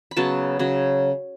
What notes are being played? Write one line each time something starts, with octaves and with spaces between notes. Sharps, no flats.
B5
C#3 F#3 B3 A5
C#3 F#3